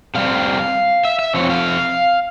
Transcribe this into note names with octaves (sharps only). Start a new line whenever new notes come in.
C3 G3 C4 F5
E5
E5
C3 F3 C4 C#5
F5